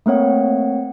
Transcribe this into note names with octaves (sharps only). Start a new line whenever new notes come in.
A3 A#3 C4 C#5 F#5